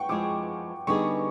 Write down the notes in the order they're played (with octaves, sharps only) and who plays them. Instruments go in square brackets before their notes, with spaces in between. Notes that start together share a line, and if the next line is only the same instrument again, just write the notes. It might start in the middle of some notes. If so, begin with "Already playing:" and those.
Already playing: [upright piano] F#5 G5 C#6
[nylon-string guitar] F3 G#3 C4 E4 G#4 [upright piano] D6
[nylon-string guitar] D3 G3 B3 D#4 G#4 [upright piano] C#6